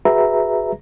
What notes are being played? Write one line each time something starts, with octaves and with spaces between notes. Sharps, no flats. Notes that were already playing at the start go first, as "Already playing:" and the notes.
F#4 G#4 B4 E5 A#5